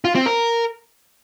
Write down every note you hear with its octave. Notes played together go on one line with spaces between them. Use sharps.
F4
C4
A#4